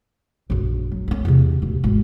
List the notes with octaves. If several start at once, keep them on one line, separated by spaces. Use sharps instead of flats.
A#1 F#2
F#3
A#3 C#4
E2 C3
D1 D#2
G#1